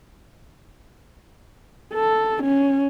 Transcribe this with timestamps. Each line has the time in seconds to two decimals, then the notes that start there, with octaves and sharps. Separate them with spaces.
1.94 A4
2.43 C#4